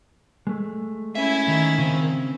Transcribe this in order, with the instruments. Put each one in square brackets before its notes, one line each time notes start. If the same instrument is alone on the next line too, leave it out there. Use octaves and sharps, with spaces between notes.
[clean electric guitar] G#3 A3
[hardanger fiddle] C#4 E4 [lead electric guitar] E5
[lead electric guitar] D#3
[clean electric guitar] C#3 C4